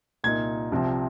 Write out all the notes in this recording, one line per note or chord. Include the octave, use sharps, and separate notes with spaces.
C2 A#2 A#3 D#4 G#6
C2 C3 F3 C4